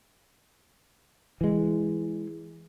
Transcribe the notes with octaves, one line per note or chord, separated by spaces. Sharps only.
E3 G#3